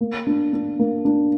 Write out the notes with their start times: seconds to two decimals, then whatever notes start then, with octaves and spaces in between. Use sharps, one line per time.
0.01 A#3
0.27 D4
0.53 D4
0.79 A#3
1.05 D4